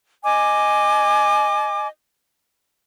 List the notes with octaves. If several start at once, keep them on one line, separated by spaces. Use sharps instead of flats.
D#5 G#5 D6